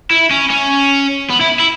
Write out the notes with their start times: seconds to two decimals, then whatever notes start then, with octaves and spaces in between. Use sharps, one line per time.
0.11 E4
0.31 C#4
0.50 C#4
1.30 B3
1.41 E4
1.60 E4